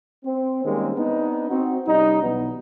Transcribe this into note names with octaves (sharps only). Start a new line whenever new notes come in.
C4
D#3 G3 G#3 A#3 C4 C#4
B3 C4 D4 D#4
C4 D#4 F#4
C2 G3 C#4 D#4
B1 B2 E3 F#3 B3